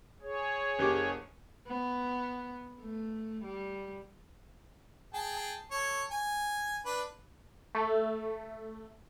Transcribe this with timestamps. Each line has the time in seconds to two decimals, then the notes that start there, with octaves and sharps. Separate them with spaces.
0.21 G#4 C#5
0.79 F#1 G4 D6
1.67 B3
2.81 A3
3.44 G3
5.14 G#4 G5 A5
5.71 A4 C#5
6.11 G#5
6.85 D4 B4
7.75 A3